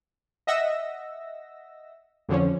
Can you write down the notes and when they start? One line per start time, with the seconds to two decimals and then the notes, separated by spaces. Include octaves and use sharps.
0.47 D#5 E5 F#5 E6 A#6
2.29 F2 D3 F3 C#4